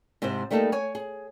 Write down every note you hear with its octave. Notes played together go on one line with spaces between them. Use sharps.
G#2 C3 E4 C5
G3 A3 A#3 D#4 A4
C#5 G#5
G#4